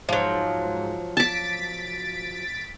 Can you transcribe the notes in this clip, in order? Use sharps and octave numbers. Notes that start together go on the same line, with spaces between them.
G#2 F3 F#3
A5 D6 A6 B6 D7